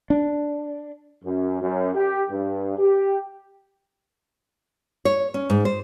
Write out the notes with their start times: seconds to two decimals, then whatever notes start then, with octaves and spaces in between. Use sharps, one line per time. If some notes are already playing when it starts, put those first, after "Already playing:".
0.10 D4
1.24 F#2
1.61 F#2
1.95 G4
2.30 G2
2.79 G4
5.05 C#5
5.34 C#4
5.50 G#2
5.65 C5